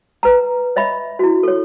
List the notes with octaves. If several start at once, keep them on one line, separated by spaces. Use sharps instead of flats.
B4 A#5
C#5 D#5 E5 B5
E4 F#4
A4 C#5